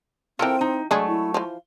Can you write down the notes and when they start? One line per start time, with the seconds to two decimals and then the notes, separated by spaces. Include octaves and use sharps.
0.39 E3 C4 F4 A4 A#4 G5
0.61 D#4
0.91 F#3 G#3 A3 D4 G#4
1.08 E4
1.34 E3 F3 F5